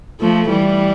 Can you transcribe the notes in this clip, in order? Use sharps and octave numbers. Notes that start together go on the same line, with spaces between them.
F3 A3
E3 G3